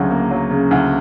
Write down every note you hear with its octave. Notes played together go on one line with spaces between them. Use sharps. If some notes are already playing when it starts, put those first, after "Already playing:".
Already playing: D2 C#3 F#3
A#3
F#3
C#3
D2